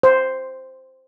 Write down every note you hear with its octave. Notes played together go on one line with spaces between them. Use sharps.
C5